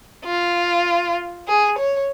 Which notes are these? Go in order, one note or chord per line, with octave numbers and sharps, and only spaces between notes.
F4
G#4
C#5